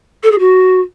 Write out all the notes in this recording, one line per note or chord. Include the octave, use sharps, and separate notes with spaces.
A4
G#4
F#4